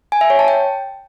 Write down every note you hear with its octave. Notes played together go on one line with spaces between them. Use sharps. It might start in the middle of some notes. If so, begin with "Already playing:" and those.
G#5
E5
C#5
A5
G5